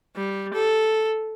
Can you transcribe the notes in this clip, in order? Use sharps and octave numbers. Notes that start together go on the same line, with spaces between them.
G3
A4